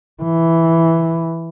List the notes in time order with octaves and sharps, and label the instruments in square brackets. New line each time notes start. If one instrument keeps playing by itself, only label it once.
[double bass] E3